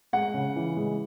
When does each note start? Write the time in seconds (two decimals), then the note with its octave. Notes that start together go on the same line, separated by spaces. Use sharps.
0.13 G#3 F#5
0.34 C#3
0.56 E3
0.76 G#3